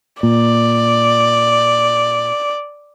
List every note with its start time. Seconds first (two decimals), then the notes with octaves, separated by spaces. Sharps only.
0.23 A#2 D5